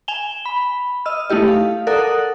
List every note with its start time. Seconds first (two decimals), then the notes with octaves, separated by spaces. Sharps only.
0.08 G#5 E7 F7 G7
0.46 B5
1.06 D#5 E6 F6
1.30 A3 D#4 E4 G4 D#5
1.48 F5
1.87 A4 A#4 D5 F#5 D#6 F#6